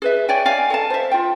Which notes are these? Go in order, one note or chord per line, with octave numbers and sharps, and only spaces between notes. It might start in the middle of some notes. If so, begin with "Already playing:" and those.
G#4 B4 E5
C#5 D5 G5 G#5
D5 F5 G#5
A4 F5 A5
C5 E5
F4 G5